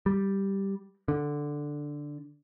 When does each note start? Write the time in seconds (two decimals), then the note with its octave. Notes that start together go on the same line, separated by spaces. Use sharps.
0.06 G3
1.08 D3